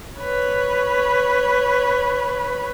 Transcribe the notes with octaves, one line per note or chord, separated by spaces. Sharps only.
B4 C#5